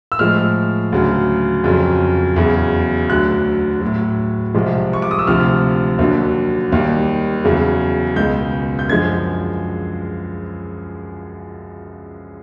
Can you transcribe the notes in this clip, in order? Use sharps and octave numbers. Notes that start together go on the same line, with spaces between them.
E6
A2 F3 G#3 F6
D2 C#3 F#3
F2 C#3 F#3
E2 C#3 F#3
D2 D3 F#3 F#6
A2 F#3
C2 C3 F3 G#3
C#6
D6
D#6
E6
D2 C3 F3 F6
D#2 D3 F#3
D#2 D#3 G3
E2 C#3 F#3
C#2 B2 G#3 G6
G6
F#2 D3 F3 G#3 G#6